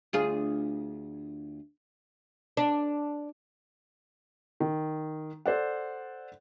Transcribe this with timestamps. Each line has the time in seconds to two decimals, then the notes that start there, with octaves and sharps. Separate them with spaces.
0.13 D2 F4 G#4
2.57 D4
4.60 D#3
5.46 A4 C5 D5 F#5